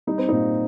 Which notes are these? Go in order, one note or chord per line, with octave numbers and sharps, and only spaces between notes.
G3 D#4
C4
A#2 D#4